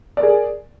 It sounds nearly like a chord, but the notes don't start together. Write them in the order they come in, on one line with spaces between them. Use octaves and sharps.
D5 A#4 G#4